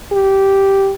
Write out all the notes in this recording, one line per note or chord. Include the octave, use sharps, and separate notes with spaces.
G4